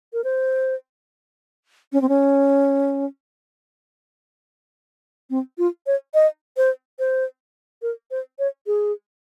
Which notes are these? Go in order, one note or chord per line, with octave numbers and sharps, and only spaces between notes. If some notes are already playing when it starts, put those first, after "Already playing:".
A#4
C5
C#4
C4
C#4
C4
F4
C#5
D#5
C5
C5
A#4
C5
C#5
G#4